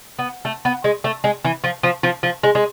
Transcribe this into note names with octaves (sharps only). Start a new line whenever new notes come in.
B3
A3
B3
G#3
A3
G#3
E3
F3
F3
F3
F3
G#3
G#3